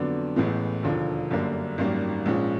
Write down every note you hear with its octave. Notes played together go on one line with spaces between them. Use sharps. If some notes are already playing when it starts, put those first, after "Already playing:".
Already playing: F2 D3 F#3 B3 D4
A1 A2 E3 G#3 B3
E1 D#2 D3 F3
G1 F#2 D3 G3 A#3
G#1 F#2 D#3 G3 A#3
A#1 G#2 F3 G#3 C#4